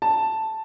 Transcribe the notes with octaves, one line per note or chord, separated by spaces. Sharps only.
A5